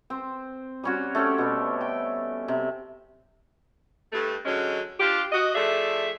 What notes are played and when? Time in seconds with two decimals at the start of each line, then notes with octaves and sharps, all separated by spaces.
0.10 C4
0.84 G3 C#4 F#4
1.15 A3 C4 C#4 G4
1.38 B2 G3
1.81 G5
2.48 C3
4.13 G2 A3
4.46 D3 F#3 G#3 C#4
5.00 D4 F4 G4
5.32 F#4 D#5
5.55 F3 A3 G#4 D5 E5